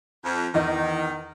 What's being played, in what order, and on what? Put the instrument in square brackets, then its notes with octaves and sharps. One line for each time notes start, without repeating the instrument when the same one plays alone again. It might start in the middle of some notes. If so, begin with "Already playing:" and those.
[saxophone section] F2
[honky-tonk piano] E2 D#5 [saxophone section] D#3